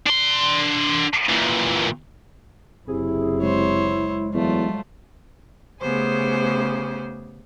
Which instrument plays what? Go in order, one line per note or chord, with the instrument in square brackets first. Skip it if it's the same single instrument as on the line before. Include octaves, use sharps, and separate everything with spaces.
[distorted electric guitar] D4 C6
A#2 E3
[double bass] F#1 E4 [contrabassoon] C3 [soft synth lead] G#4
[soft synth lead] G#3 [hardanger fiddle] C5 C#5
[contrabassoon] E2 [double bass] F#3 [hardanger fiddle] A3 F4
[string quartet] C#3 A3 B3 G4 G#4 C5